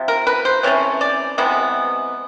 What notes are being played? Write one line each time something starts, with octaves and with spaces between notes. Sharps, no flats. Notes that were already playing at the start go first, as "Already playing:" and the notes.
Already playing: C3 F3
A#4
B4
C5
C3 E3 A3 C#4 C#5
D5
C3 E3 G#3 B3